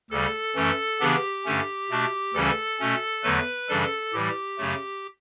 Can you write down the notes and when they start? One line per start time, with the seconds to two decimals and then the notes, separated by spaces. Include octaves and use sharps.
0.10 D2 C#3 G3 A4
0.55 F#2 E3 A3 C#4
1.00 C#3 E3 B3 D4 G4
1.45 G2 D3 A3 C#4
1.90 B2 A3 D4
2.34 D2 C#3 E3 G3 C#4 A4
2.80 B2 A3 C#4
3.23 E2 D3 F#3 A3 B4
3.69 F#2 C#3 E3 G3 D4 A4
4.13 A2 E3 G3 G4
4.58 F#2 C#3 F#3 A3